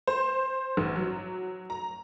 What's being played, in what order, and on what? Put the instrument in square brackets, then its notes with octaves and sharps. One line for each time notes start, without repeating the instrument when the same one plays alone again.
[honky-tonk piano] C5
A1
F#3
A#5